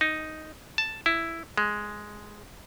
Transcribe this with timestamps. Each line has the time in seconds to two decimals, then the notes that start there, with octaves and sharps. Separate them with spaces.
0.01 D#4
0.78 A5
1.06 E4
1.58 G#3